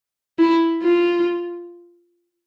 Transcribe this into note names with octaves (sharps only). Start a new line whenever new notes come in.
E4
F4